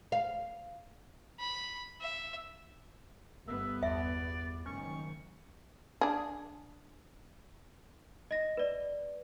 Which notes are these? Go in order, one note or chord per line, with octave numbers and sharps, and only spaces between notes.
F5
B5
E5
G1 B3 E5
E2 D5 E5
F#1 G#2 D#3 C#4 C#6
D4 G#4
D#5 A#6
B4 D5